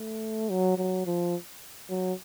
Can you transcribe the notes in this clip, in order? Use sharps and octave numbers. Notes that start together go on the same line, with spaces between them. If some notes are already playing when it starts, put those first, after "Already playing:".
Already playing: A3
F#3
F#3
F3
F#3